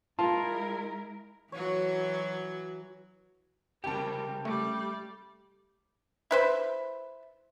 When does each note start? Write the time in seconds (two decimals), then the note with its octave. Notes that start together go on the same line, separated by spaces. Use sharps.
0.19 G#3 E4 F4 A#4 A5
1.52 E3 F#3 F#4 C#5
3.84 C2 C#3 G3 G4 A#4 G5 A5
4.45 G3 A3 D5
6.31 E4 B4 C5